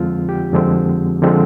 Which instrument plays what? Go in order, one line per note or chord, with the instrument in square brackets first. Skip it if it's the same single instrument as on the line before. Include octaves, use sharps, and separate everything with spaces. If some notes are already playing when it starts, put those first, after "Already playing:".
Already playing: [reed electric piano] F2 D3 F3 G#3 C4 F4
G4
F2 D3 F3 G#3 C4
D3 F3 G#3 C4